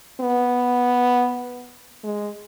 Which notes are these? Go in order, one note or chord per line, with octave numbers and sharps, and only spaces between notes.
B3
G#3